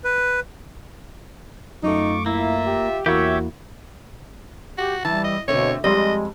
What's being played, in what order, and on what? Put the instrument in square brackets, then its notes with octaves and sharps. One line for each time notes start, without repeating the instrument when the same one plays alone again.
[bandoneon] B4
[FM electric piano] F#2 A3 [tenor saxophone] D#4 [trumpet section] F4 C#6 D6
[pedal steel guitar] A#3 [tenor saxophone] E4 [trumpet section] F4 E5
[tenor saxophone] G4
[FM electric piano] E2 A#3 E4 [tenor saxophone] F#4 [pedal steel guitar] G4 C#5 [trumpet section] E5
[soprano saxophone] F#4 [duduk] G4
[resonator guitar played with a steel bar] E3 [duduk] G3 [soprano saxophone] A5
[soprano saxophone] D#5
[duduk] B2 [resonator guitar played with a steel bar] D3 A3 C4 [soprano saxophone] C#5
[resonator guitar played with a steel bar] F2 [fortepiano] G3 C6 [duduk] G#3 [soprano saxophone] D#5